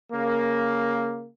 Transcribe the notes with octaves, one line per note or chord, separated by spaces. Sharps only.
C#3 A#3